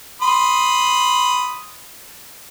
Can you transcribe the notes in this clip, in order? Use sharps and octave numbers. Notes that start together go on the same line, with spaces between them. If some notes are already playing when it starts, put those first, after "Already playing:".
B5 C6 D#6